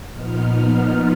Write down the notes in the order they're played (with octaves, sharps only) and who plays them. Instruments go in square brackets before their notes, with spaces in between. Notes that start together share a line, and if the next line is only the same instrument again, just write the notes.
[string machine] A#2 F3 B3 D#4 F6